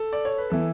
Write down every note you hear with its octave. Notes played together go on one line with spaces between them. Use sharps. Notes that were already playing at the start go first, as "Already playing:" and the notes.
Already playing: A4
D5
C#5
B4
E3 B3 E4 A4